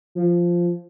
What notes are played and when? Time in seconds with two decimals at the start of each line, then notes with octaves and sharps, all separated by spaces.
0.15 F3